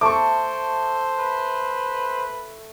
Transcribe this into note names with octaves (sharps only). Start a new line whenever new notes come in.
A3 C5 C#6 D6
B4